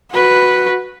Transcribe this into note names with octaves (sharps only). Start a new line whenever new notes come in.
F#4 B4